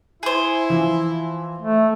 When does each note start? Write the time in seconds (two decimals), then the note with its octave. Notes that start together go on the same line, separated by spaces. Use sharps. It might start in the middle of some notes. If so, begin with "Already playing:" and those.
0.23 E4 G#4 C5
0.70 E3 F3
1.61 A3